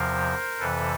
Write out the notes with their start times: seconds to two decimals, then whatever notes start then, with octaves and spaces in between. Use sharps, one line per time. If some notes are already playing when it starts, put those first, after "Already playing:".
Already playing: E2 C3 F3 A#4 C5
0.59 F2 C3 E3 A4 B4